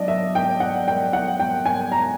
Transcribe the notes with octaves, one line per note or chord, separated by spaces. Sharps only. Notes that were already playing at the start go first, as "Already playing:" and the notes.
Already playing: F#3 D4 D5 D#5
E5
G5
F#5
G5
F#5
G5
G#5
A#5